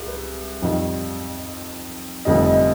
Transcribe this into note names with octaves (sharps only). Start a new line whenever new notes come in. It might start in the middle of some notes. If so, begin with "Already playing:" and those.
Already playing: C2 G#4
B4
F2 D#3 G3
F1 F2 D3 G3 D#5
D#5